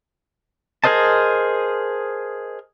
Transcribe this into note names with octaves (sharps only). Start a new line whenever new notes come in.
G#4 A#4 C5 D#5 A5